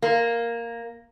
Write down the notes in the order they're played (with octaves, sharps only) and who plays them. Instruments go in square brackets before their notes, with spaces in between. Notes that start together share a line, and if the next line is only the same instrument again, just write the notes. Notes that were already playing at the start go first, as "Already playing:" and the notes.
[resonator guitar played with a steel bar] A#3